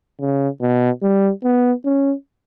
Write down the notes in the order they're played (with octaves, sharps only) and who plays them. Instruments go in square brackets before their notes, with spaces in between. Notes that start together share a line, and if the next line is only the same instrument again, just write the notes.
[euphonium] C#3
B2
G3
B3
C#4